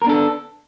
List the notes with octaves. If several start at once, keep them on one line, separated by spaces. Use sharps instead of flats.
B3 D4 A4 A#4